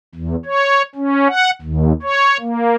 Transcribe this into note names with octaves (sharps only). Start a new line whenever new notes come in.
E2
C#5
C#4
F#5
D#2
C#5
A#3